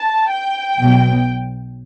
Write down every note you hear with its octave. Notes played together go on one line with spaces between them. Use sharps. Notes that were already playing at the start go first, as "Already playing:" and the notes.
Already playing: A5
G5
B1 B2 F#3